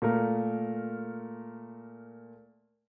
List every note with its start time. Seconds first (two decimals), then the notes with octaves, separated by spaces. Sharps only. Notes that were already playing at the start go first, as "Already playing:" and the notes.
0.02 A#2 A3 A#4